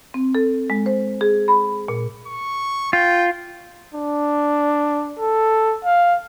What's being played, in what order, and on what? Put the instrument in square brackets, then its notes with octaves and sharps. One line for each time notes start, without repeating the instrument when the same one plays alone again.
[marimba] C4
A4
G#3
C5
G#4
B5
A#2
[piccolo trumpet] C#6
[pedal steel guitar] F4 [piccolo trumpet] G5
[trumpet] D4
A4
F5